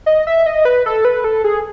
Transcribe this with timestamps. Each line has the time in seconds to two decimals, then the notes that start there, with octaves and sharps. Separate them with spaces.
0.06 D#5
0.27 E5
0.46 D#5
0.65 B4
0.86 A4
1.05 B4
1.24 A4
1.44 G#4